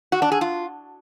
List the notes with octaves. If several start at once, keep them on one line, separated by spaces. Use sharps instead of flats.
F#4
D4
G#4
F4